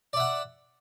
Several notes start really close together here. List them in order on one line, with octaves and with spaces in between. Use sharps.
D5 E5 F#5